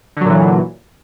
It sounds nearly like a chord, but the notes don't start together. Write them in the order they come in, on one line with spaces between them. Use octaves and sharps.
D3 F#3 A#2 E3